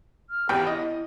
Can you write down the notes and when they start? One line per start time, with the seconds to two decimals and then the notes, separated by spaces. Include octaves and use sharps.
0.30 F6
0.49 G#1 E2 G4 G5
0.67 E4 D#5